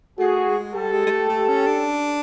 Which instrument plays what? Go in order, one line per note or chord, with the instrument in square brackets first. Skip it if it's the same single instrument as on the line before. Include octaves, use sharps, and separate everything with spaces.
[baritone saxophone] A3 [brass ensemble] F#4 G#4
[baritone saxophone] G#3
[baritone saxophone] G3 [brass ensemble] G4 A4
[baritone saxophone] G#3
G#3
A3
A3
C#4
D4